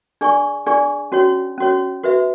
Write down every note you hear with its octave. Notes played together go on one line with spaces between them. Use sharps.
D4 G#4 D5 G#5 C#6
D4 G#4 D5 G#5 C#6
C#4 F#4 C#5
C#4 F#4 C#5
F#4 B4 E5